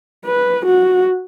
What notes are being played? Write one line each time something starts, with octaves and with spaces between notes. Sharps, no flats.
B4
F#4